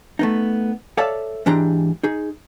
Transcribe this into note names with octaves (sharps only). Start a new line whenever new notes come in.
A3 B3 D#4
A4 C#5 D5 E5 F5 A5
G#2 E3 D4 G4 A#5 C6
D#4 G#4